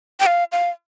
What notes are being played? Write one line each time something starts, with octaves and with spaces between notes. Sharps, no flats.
G5
F5
F5